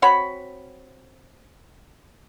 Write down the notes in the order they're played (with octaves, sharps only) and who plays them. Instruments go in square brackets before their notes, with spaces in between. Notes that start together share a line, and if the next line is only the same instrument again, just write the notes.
[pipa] C4 F#4 C#5 B5